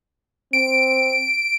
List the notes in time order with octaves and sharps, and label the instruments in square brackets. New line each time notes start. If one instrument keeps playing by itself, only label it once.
[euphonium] C4 [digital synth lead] D7